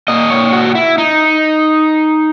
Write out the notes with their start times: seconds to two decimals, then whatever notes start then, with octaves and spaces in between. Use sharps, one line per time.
0.08 A#2 A#3 D#5
0.30 C#5
0.52 F#4
0.75 E4
0.98 D#4